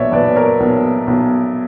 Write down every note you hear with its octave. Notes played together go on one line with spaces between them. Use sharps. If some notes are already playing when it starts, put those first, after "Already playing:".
Already playing: B1 A#2 B4 C#5 D5 E5
B1 B4 D5
A#4 C#5
B1
B1